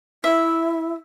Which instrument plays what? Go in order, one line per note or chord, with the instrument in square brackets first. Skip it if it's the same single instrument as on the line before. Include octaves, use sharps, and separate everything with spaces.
[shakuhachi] E4 [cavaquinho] E5